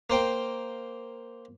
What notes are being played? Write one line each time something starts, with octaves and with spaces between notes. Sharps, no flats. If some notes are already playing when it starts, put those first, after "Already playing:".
A#3 C5 G5